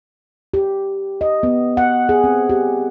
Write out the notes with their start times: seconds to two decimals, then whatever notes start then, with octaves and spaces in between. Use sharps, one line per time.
0.54 G4
1.21 D#5
1.43 B3
1.77 F#5
2.09 G#4
2.24 C4
2.50 G4